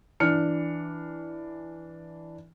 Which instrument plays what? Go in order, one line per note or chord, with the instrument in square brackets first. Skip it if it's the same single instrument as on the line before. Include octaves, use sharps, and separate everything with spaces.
[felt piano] E3 D4 F6 C#7